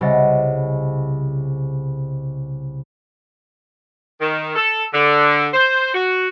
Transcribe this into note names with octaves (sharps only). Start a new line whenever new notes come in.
C2 C#3 D#5 F#5 A6
D#3
A4
D3
C5
F#4